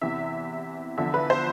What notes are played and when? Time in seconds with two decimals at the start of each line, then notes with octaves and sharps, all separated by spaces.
0.01 E2 C3 E3 E5
0.97 E2 D3 F3 E5
1.14 B4
1.30 C5